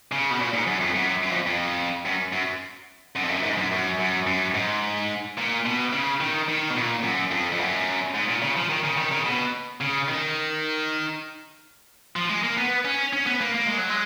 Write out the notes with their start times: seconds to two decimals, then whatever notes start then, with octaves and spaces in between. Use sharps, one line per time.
0.12 C#3
0.30 B2
0.39 A#2
0.53 G#2
0.67 F#2
0.81 F2
0.94 F#2
1.22 F#2
1.31 F2
1.46 F2
2.06 F#2
2.33 F#2
3.16 F#2
3.24 F2
3.30 F#2
3.44 G#2
3.58 F#2
3.72 F#2
3.99 F#2
4.27 F#2
4.54 G#2
5.38 A#2
5.65 B2
5.93 C#3
6.20 D#3
6.48 D#3
6.70 B2
6.76 A#2
7.04 F#2
7.31 F2
7.52 F2
7.59 F#2
8.14 G#2
8.28 A#2
8.42 C#3
8.56 F3
8.70 D#3
8.84 C#3
8.97 D#3
9.12 C#3
9.25 B2
9.81 C#3
10.08 D#3
12.16 F3
12.30 G#3
12.43 A#3
12.58 B3
12.85 C#4
13.13 C#4
13.26 B3
13.41 A#3
13.54 A#3
13.66 G#3
13.78 F#3
13.89 G#3